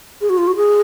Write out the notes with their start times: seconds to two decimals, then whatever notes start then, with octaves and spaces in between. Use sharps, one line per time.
0.21 G#4
0.30 F#4
0.38 F4
0.47 F#4
0.56 G#4